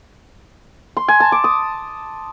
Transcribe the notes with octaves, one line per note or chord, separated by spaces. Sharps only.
C6
G#5
A5
D6
D#6